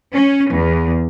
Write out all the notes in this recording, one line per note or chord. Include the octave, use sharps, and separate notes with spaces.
C#4
E2